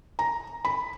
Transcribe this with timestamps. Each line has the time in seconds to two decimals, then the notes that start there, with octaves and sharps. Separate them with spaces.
0.19 A#5
0.65 B5